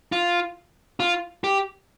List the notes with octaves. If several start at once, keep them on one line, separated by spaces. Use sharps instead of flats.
F4
F4
G4